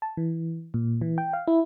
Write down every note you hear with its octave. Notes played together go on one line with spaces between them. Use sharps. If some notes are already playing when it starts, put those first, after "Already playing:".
A5
E3
A#2
E3
G5
F5
E4